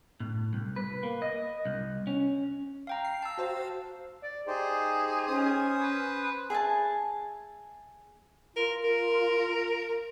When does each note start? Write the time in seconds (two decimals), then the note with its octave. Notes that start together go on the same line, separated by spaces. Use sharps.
0.20 A2
0.53 C2
0.76 B4
1.03 A#3
1.22 D#5
1.65 C2
2.07 C#4
2.87 F5 G5 A#5
3.05 C7
3.23 A5 E6
3.38 F#4 C5 F5
4.23 D5
4.47 D#4 G4 G#4 C5
5.27 C#4 C5 D#6
5.78 B4
6.50 G#4 E5 G#5 A5
8.56 F4 A#4
8.84 A#4